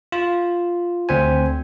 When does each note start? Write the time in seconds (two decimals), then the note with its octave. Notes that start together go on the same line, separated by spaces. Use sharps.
0.12 F4
1.09 D2 C4 C5 G#5